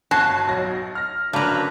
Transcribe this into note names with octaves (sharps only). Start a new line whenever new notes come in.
G1 F#4 A5 G#6 C7
B1 F#3 A#6
F6 A#6
F#2 D3 A#3 D4 A4 B4 A#5